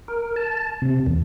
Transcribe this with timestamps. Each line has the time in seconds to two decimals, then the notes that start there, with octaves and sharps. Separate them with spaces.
0.08 A#4
0.36 A5
0.82 C3
1.06 E2